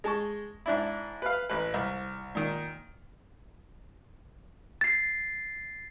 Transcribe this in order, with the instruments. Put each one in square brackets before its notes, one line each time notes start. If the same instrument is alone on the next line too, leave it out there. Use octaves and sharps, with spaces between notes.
[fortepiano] G#3 A5 C#6
G#2 D4 E4
B4 F5
A1 B4
C2
A#2 D#3
[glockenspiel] A6 C7